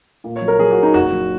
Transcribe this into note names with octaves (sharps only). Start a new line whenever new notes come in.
A#2
C#5
F#3
A#4
F#3 G#4
F#4
A#2
D#4
F#1 F#4
F#3